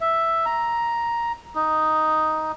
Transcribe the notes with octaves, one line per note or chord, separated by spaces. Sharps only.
E5
A#5
D#4